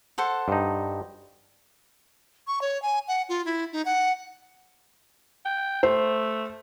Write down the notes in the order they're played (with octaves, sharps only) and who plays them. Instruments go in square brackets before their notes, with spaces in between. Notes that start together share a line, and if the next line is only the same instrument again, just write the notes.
[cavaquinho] A4 C5 F#5
[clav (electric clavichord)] G2 D#4
[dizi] C#6
C#5
G#5
F#5
F4
E4
D#4
F#5
[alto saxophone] G5
[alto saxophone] A3 [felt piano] C5